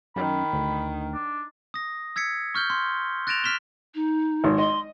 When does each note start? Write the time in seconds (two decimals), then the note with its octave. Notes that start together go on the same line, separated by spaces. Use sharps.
0.16 F#2 D#3 B5
0.53 D2
1.14 D4
1.74 D#6 A#6
2.16 E6 G#6 B6 C#7
2.55 C#6 F6 G6 G7
2.70 C6
3.27 F#6 A6 A#6 D7 E7 F7
3.44 F6 B6 E7 G7
3.95 D#4
4.44 G#1
4.58 D#5 C6